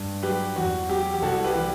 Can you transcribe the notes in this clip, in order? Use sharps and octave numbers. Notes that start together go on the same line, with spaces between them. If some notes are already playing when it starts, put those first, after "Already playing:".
Already playing: G2
F#3 G4 B4
E2 F#4
F#3 G4
G4
C2 F#4 A4
G4 B4
E3